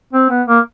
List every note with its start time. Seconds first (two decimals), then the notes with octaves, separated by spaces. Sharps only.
0.13 C4
0.30 B3
0.48 A#3